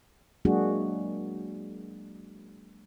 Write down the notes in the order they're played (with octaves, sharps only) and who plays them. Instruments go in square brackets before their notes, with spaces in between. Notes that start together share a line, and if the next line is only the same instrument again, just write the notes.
[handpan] F#3 G#3 A#3 D4 F#4 G#4